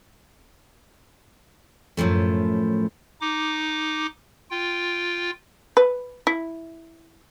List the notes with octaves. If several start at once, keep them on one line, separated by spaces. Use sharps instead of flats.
F#2 A2 F3 A3
D#4 D6
F4 G5
B4
E4